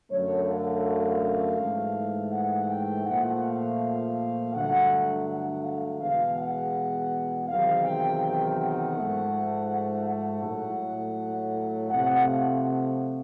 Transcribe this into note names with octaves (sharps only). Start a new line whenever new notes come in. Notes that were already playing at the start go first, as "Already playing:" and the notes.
F#2 D3 F#3 A3 C#5
F5
G#2 E3 A3
F#5
G5
A#2 F3 A3 F#5
F5
G2 D3 F#3 A3 F#5
F#5
F5
E2 B2 G#3 F5
F#5
E2 C3 D#3 F#3 F5
G5
G5
F#5
G#2 F3 A3
F#5
F#5
A2 F#3 A3
C3 F3 A3 F#5
F5
F#5